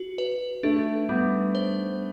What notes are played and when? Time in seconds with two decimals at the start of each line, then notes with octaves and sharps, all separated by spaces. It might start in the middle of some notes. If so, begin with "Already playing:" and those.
Already playing: F#4
0.18 B4
0.63 A3 D4
1.09 G3 B3
1.55 C5